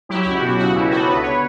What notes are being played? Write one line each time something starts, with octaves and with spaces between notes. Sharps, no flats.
F#3 E4 G4
C#2 E4 G4
F#4
B2
E4
C#3 F#4
C#2 E4 G4
B3 F#4 A4
D3 B4
C#5